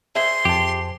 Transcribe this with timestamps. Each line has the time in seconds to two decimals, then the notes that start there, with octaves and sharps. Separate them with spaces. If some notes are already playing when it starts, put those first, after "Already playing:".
0.15 G#4 C5 E5 C6
0.45 F2 G4 A5